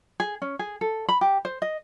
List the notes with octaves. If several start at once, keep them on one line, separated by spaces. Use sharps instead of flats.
G#4
C#4
G#4
A4
B5
G4
C5
D#5